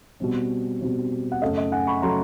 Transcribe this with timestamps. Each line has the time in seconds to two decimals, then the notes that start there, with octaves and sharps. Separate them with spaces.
0.20 B2 G3 C4
0.81 B2 G3 C4
1.32 F#5
1.42 F#2 C#3 F#3 A3 C#4 D#5 F5
1.57 D#5
1.72 F#5 G#5
1.87 B5 C#6
2.02 C#3 F#3 A3 C#4 A#5 C6